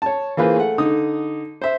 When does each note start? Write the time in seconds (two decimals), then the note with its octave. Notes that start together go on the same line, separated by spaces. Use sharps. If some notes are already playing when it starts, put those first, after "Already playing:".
0.02 C#5 A5
0.37 E3 A#3 F4 G#4 B4 C5
0.57 A3 F#5
0.78 D3 D#4 D#6
1.62 C5 E5